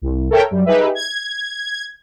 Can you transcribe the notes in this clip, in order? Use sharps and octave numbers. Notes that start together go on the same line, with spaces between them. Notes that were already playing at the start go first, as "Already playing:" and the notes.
C2
A4 A#4 C#5 E5 G5
F#2 G3
D#4 G4 G#4 B4 E5
G#6